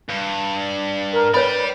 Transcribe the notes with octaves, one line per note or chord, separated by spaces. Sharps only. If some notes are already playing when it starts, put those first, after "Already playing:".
G2
A#4
B4 C#5 D5 G5 B5